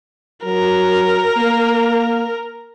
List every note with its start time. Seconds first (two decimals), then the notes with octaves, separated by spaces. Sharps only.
0.45 F#3 A#4
1.37 A#3